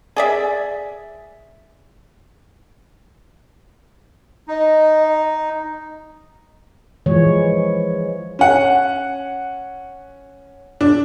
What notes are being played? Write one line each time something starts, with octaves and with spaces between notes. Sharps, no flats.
G#4 D5 E5
D#4 D#5
E3 F3 G#3 C#5
C#4 F#5
D4